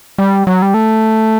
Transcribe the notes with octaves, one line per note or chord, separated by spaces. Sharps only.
G3
F#3
G3
A3